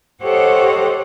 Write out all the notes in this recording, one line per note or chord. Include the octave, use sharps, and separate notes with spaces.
G4 A4 C5 C#5 D#5 F#5